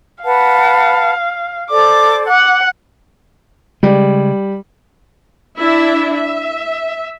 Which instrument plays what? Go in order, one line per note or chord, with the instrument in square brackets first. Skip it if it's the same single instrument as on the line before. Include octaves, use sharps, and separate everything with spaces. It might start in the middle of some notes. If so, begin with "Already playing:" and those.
[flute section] B4 F#5 A5 [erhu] F5
[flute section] A4 C5 D5 [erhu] D6
[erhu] F#5 [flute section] D6
[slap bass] C#3 G#3 [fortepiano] G3
[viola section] D4 E4 E5
E5